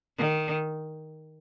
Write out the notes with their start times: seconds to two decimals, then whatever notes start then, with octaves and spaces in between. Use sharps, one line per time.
0.18 D#3